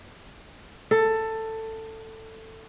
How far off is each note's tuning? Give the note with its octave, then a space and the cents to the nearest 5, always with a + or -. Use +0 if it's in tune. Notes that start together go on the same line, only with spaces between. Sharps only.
A4 +15